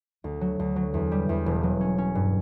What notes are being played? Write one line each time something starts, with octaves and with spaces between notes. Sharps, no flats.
D2
F#3
D2
F#3
E2
G3
E2
E1
F#3
C#4
C#4
G2